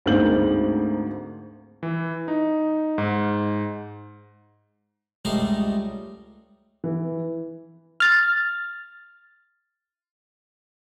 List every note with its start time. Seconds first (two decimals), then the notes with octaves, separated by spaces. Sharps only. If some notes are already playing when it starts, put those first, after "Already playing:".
0.06 D2 G#2 A#3 C4 G6 F#7
1.83 E3
2.28 D#4
2.98 G#2
5.25 C#2 G3 A3 D#4 A#5 C6
6.84 E3
8.00 F6 A6